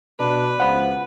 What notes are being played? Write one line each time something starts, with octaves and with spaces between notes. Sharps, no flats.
B2 D4 B4
C#2 F3 F#5 B5